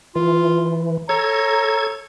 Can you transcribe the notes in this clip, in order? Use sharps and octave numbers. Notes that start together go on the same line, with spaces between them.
E3 F4
A4 C#5 A#5 G#6